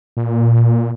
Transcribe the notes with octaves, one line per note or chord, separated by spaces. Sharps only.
A#2